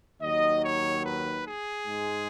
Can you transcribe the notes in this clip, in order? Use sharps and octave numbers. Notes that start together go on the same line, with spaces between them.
D#2 D#3 F#3 D#5
C#5
B4
G#4
G#2 G#3